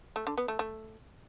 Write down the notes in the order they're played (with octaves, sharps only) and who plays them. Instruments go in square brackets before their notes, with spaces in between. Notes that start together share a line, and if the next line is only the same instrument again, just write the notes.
[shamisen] A3
D3
B3
A3
A3